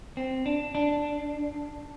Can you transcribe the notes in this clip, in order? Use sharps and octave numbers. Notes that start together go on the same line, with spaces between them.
C4
D4
D4